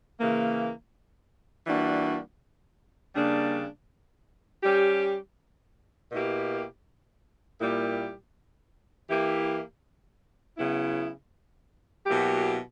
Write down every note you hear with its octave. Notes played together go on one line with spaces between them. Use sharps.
C#3 E3 A#3
E3 G3 A#3 D4 F#4
C#3 G3 A#3 D4
G3 C#4 G4
B2 A#3 E4 G4
A#2 G3 A#3 E4 G4
E3 A#3 E4 G4
C#3 F#3 B3 E4
B2 F#3 A#3 E4 G4